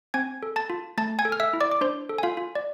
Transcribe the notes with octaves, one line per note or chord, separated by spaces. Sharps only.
C4 G#5 G#6
A4
A5 A6
F4
A3 A5 A6
G#5 G#6
A4
F6
E5 E6
E4
D5 D6
D6
D4 C5 C6
A4
G#5
F4 F5
F4
D5